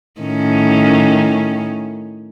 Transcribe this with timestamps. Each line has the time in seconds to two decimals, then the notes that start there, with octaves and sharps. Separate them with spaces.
0.21 A2 D#3 C#4